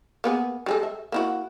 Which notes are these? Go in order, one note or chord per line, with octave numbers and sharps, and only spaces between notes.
A#3 B3 G#4
G3 G#3 A4
E5
A#3 E4 F#4